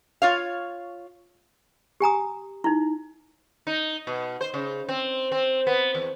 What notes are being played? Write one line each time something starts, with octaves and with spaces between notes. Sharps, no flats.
F4 C#5 F5
G4 G#5 A#5 D#6
D#4 E4
D#4
B2
C5
C#3
C4
C4
B3
E2